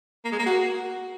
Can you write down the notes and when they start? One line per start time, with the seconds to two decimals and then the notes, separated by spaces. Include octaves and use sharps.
0.25 A#3
0.32 G#3
0.39 A#3
0.46 F#4